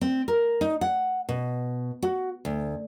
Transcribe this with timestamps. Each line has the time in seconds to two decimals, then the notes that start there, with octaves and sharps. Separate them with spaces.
0.01 C4
0.28 A#4
0.61 D#4
0.81 F#5
1.29 B2
2.02 F#4
2.45 D2